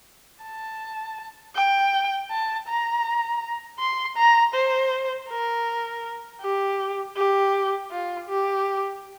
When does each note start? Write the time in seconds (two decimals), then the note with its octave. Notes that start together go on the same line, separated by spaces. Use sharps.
0.43 A5
1.55 G5
2.31 A5
2.68 A#5
3.80 C6
4.17 A#5
4.54 C5
5.29 A#4
6.41 G4
7.17 G4
7.91 F4
8.28 G4